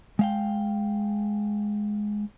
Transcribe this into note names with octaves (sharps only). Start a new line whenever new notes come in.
G#3 F5 G5